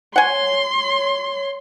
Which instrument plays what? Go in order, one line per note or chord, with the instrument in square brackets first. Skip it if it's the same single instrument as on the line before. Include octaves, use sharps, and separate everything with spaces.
[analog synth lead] C#5 [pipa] F#5 G#5 [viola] C6